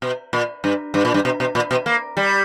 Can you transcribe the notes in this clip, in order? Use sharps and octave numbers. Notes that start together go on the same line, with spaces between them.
B2
A#2
G2
G2
A#2
G2
B2
B2
A#2
B2
A#3
G3